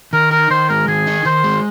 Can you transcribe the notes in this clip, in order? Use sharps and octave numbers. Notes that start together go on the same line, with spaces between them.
D#3 A#4
D#4 A#4
D#3 C5
G#3 A#4
D#3 G#4
D#4
D#3 C5
G#3